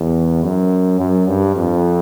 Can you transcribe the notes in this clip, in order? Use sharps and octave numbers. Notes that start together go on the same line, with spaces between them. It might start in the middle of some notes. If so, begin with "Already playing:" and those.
Already playing: E2
F#2
F#2
G2
F2